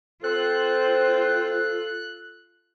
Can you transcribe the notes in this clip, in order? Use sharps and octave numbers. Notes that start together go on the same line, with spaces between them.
C4 F4 A4 C5 F#6